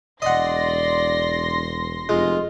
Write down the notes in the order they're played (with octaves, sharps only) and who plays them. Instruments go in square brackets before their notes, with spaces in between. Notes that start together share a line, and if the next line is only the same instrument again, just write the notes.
[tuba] E1 [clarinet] D5 [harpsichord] D#5 F#5 [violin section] C6 A#6
[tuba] F1 [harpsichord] G#3 [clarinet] F4